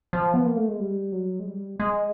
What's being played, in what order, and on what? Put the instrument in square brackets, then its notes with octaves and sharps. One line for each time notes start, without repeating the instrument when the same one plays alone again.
[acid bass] F3
B3
A#3
A3
G#3
G3
F#3
G#3
G3
G#3